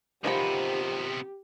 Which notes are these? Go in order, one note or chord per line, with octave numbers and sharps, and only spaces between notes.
C3 D#3 F3 B3 G4 B5